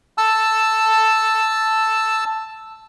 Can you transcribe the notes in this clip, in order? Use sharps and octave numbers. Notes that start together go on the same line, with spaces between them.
A5 E6